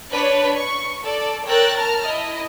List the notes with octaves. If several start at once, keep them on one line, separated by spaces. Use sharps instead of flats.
D4 B4 C#5
C#6
A4 D5
A#4 C#5 G5 E6 F#6 A6
A5 A#5 F6
E4 D#5